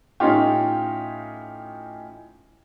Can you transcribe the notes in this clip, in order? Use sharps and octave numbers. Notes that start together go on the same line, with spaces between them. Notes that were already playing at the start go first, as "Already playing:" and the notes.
A2 C#4 D#4 F4 G4